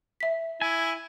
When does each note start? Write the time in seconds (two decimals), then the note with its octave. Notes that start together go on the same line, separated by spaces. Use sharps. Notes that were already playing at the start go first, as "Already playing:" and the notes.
0.20 E5 B6
0.62 E4 G#5